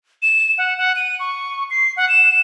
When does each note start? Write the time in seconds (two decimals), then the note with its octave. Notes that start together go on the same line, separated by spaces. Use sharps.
0.22 E7
0.58 F#5
0.78 F#5
0.96 D#7
1.20 C#6
1.71 C7
1.97 F#5
2.09 E7